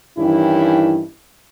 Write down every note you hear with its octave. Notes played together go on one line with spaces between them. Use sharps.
G2 D#3 E3 C#4 E4